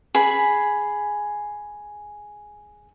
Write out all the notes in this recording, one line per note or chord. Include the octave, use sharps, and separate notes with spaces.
G#4 B5